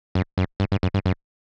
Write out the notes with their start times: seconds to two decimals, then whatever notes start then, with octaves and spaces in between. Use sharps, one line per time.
0.15 F#2
0.38 F#2
0.60 G2
0.72 G2
0.83 F#2
0.94 G2
1.06 F#2